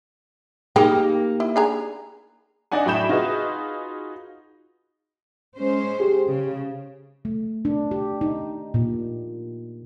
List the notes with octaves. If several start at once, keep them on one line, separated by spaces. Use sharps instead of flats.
A#3 D#4 G4 G#4 G5
E4
D4 G#4 A#5
D4 D#4 D5 F#5 G#5
A2 F#3 G5 B5 G6 E7
D#4 F4 F#4 G#4 B4
G#3 C#4 C5
G4 G#4
C#3
A3
D4
G4
D#4
A#2